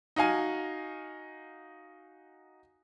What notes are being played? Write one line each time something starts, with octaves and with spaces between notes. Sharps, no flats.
D#4 F#4 F5 G#5